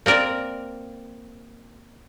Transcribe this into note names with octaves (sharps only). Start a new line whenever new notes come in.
A#3 C4 A#4 D5